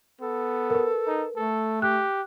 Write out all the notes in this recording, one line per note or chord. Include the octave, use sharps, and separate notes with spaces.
B3 A4
A#4 B4
D#4
A3 A4
G4 F#6